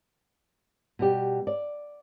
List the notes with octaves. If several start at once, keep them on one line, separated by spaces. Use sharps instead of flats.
B2 G3 G4
D5